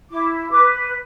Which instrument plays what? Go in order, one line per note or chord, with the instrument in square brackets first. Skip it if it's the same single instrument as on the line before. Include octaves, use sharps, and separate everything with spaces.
[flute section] E4 D6
B4 D6